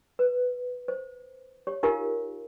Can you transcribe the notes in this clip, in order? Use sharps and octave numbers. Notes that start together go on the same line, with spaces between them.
B4
C5
G4 C#5
D#4 F4 G4 A#4 F5